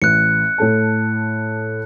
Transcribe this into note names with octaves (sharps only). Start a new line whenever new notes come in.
A1 F#6 C#7
A2 A4 A5